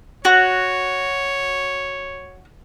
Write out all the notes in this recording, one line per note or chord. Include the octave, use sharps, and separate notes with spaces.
F#4 C#5